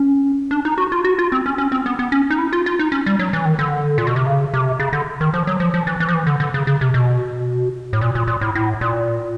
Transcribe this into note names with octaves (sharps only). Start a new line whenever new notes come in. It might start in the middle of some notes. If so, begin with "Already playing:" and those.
Already playing: C#4
D4
D#4
F#4
F4
F#4
F4
C4
C#4
C#4
C4
B3
B3
C#4
D#4
E4
F4
F4
D#4
C#4
G3
F#3
E3
D#3
D3
A#2
B2
C3
C#3
C3
C#3
D3
D#3
F3
F#3
F3
F3
E3
E3
F3
E3
D3
D3
C#3
C#3
C3
B2
A2
A#2
A#2
A#2
A2
A2
A#2